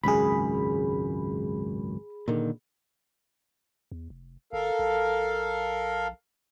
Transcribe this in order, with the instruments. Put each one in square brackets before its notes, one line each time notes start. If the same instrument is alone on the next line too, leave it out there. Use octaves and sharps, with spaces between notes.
[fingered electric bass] G#1 C#2 F#2 [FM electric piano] G#4 B5
[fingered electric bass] A#2 D3 D#3
[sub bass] E2
F1
[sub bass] G#1 [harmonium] A4 A#4 F5
[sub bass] A#1